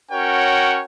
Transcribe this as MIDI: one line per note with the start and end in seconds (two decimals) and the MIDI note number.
0.11 0.83 61
0.11 0.83 66
0.11 0.83 70
0.11 0.83 73
0.11 0.83 78
0.11 0.83 79